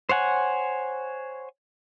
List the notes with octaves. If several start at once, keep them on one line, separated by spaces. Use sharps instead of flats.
C5 C#5 F#5 G#5